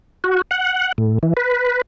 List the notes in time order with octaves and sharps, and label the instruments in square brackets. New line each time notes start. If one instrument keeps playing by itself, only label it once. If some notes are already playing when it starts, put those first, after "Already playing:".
[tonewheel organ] F#4
F#5
A2
E3
B4